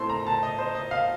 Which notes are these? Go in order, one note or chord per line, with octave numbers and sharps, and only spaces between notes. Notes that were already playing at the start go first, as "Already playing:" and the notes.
Already playing: A2 A3 C4 C6
A#5
A5
D#5
C5
D#5
F5